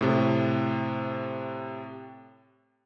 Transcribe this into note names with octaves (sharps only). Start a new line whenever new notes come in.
A2 C3 A4